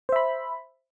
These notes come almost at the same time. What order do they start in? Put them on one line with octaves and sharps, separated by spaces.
C5 E5 B5